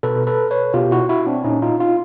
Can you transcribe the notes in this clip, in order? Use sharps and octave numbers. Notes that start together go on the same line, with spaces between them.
B2 A4 B4
A4 B4
B4 C#5
B2 F4 G4
E4 F#4
E4 F#4
C4 D4
A#2 C#4 D#4
D#4 F4
D#4 F4